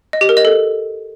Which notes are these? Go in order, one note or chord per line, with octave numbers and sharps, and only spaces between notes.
D#5
G4
A#4
D#5
A4